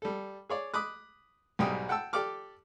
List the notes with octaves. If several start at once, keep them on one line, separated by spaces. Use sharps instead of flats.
G3 A4
G#4 C#5 D5
B5 D6 D#6 F#6
B1 G#2 G3 G5 D#6
F#5 G5 A5 E6
G4 A4 D5 D6 F6